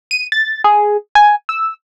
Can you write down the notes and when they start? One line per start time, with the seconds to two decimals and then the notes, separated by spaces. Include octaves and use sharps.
0.11 D#7
0.32 A6
0.64 G#4
1.15 G#5
1.49 E6